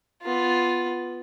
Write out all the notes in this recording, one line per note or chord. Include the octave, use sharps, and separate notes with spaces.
B3 F4